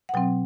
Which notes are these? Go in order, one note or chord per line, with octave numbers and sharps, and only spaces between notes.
F#5
B2 F#3 C4 G5